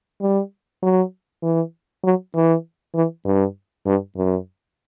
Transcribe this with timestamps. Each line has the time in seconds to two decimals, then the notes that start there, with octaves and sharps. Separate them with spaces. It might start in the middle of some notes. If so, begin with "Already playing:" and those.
0.21 G3
0.83 F#3
1.43 E3
2.04 F#3
2.35 E3
2.95 E3
3.25 G2
3.86 G2
4.17 F#2